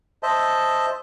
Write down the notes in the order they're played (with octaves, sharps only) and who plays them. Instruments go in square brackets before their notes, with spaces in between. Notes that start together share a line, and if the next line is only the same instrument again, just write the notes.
[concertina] C5 D#5 E5 A5